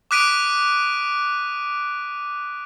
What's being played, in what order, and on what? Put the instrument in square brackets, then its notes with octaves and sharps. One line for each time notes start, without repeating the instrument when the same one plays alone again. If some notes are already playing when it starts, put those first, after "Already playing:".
[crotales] D6 D#6 F#6 B6 D7 D#7